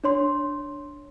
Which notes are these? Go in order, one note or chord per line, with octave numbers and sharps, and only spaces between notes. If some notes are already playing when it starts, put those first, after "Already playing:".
D4 C#5 C6